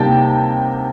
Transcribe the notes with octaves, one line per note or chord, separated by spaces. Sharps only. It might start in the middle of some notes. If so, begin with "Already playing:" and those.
Already playing: C3 G3 A#3 D#4 G5 A5